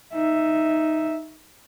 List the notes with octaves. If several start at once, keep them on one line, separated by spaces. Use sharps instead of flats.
D#4 E5